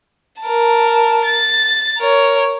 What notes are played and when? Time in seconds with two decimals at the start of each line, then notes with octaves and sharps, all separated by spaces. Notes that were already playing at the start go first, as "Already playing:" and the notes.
0.42 A#4 A5
1.25 A6
1.98 A#4 C#5